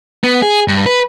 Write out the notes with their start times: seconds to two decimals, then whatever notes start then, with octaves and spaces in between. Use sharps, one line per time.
0.24 B3
0.42 G#4
0.68 G2
0.86 B4